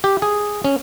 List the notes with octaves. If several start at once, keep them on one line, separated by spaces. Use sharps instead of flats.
G4
G#4
C#4